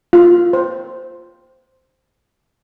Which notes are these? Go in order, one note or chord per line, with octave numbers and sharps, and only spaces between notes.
F4
C5